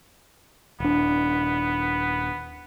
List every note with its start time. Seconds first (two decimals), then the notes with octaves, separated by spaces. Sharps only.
0.80 D#1 B3 D4